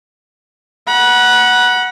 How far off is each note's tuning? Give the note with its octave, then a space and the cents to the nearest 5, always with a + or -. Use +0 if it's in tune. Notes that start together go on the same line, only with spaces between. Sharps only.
F#5 +0 B5 -45